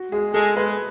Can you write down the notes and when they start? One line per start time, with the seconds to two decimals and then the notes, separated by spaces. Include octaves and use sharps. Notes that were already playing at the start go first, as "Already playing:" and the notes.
Already playing: F#4
0.12 G#3 G#4
0.34 G#3 A4
0.56 G#3 B4